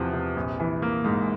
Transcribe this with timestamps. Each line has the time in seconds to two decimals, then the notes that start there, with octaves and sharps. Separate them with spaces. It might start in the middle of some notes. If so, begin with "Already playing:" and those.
Already playing: E2 C3 F3
0.13 C3
0.36 A#1
0.60 E3
0.82 A#3
1.04 G#2